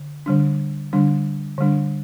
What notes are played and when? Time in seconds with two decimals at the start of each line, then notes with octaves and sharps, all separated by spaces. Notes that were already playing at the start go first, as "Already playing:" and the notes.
Already playing: D3
0.26 D3 G3 D4
0.93 D3 G3 D4
1.58 D3 G3 D4